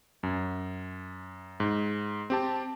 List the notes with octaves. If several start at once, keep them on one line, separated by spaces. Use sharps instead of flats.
F#2
G#2
C4 G4 A5